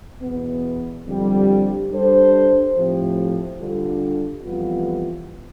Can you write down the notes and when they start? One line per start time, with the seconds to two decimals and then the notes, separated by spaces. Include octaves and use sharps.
0.22 E2 B2 B3
1.06 F2 D3 G3
1.90 G3 D4 A4 C5
2.75 A2 F3 A3 C4 G4
3.59 D3 G3 D4 F4 A4
4.43 F2 E3 G3 B3 F4